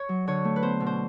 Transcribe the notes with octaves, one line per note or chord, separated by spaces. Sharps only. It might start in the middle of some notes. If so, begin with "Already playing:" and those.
Already playing: C#5
F#3
D3 C#5
A3
B4
B3 C5
B2
C5